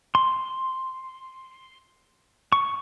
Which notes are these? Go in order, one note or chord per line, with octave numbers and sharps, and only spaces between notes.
C6
C#6